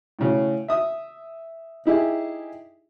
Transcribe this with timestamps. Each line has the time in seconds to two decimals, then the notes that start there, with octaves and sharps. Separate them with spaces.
0.19 A2 C#3
0.68 E5 D#6
1.85 D#4 E4 G4 G#4